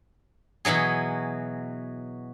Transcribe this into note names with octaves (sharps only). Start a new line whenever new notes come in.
B2 E3 F#3 G#4